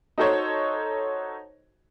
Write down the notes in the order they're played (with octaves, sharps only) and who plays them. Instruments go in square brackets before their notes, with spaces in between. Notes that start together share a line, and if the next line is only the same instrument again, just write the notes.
[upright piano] D#4 F#4 A4 C5 C#5